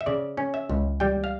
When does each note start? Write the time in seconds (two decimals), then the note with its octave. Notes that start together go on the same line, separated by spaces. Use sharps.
0.01 E5
0.06 C#3 D5
0.37 C#4
0.54 E5
0.70 C#2
1.00 G3 G5
1.24 F5